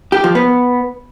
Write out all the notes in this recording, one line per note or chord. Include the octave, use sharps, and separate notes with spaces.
G4
F3
B3